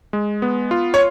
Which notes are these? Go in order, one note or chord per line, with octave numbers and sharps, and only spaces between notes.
G#3
B3
F4
C#5